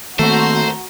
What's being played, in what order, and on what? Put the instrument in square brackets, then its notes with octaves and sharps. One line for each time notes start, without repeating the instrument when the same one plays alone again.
[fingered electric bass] D#3 A#3 C4 [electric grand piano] A3 [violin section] F#4 A#5 [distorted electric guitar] C5